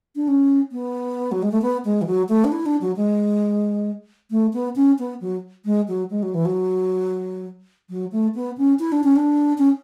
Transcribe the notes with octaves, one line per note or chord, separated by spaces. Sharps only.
D4
C#4
B3
F#3
G#3
A3
B3
G#3
E3
F#3
A3
D4
E4
D4
F#3
G#3
A3
B3
C#4
B3
F#3
G#3
F#3
G#3
F#3
E3
F#3
F#3
A3
B3
C#4
E4
D4
C#4
D4
C#4